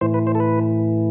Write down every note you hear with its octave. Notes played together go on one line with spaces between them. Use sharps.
A2 E3 C5
B4
C5
A4
B4